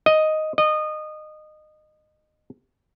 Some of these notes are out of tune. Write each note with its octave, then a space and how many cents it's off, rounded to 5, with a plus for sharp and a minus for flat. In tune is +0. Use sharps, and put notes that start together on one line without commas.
D#5 +5
D#5 -20